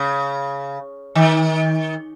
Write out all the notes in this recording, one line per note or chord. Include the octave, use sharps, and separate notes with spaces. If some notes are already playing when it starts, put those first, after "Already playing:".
Already playing: C#3
D#3